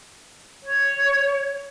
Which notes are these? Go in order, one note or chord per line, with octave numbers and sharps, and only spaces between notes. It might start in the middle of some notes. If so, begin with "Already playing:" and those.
C#5